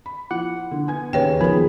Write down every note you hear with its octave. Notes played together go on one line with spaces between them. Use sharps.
B5
F3 E4 F#5
D3
B3 G#5 G#6
D#2 C#3 B4 C#5 G5
D#3 F3 B3 G#4 A#4 B5